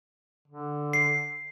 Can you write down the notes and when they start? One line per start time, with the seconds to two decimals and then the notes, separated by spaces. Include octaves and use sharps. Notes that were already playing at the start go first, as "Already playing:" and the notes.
0.47 D3
0.93 C7